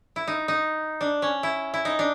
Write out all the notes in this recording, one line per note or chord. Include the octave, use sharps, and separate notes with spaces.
E4
D#4
D#4
D4
C#4
E4
E4
D#4
D4